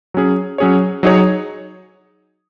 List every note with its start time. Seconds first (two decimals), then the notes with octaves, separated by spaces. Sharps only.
0.14 F#3 C#4 G#4
0.58 F#3 C#4 G#4 C#5
1.03 F#3 D#4 G#4 C#5